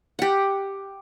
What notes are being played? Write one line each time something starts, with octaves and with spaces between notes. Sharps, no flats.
G4 F#5